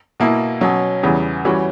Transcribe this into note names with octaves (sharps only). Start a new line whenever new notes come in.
B2 A#3 E4
B2 F#3 C#4
E2 C#3 E3 G3
E3 G3 C#4 F#4